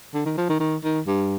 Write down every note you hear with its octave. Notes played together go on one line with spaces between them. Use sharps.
D3
D#3
F3
D#3
D#3
D#3
G2